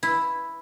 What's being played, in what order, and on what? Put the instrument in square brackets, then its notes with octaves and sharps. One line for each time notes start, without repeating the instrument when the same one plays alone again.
[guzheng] E4